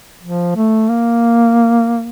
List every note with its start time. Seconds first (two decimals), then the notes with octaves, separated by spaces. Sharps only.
0.23 F3
0.56 A3
0.89 A#3